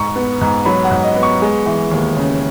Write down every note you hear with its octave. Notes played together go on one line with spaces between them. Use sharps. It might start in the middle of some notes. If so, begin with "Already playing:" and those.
Already playing: G#2 C#6
B3
G#2
F#3 B5
F#5
G#2
D#5
B3
C#6
G#3
E3
D#2
C#3